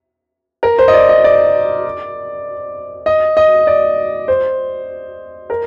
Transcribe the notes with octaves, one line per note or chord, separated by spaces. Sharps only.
A#4
C5
D#5
D5
D#5
D5
D#5
D#5
D5
C5
A#4